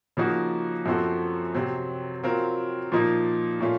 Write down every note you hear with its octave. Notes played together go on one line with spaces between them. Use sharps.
C#3 F3 A#3 D#4 F#4
F#2 F3 C4 F#4 A4
C3 F#3 C4
F#3 C4 F4 A#4
A#2 F3 A#3 D#4
A#2 A3 C#4 F4